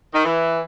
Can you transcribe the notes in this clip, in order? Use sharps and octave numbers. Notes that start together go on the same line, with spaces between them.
D#3
E3